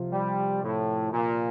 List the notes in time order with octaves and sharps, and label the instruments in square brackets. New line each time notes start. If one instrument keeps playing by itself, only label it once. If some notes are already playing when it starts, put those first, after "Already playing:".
Already playing: [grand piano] C3 F3 C4 F4
[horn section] G3
A2
A#2